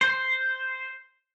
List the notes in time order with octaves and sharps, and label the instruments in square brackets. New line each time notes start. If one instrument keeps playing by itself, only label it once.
[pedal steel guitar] C5